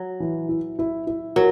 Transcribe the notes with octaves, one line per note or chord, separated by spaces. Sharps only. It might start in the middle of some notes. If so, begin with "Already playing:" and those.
Already playing: F#3
E3
E4
E4
E4
F#3 A#4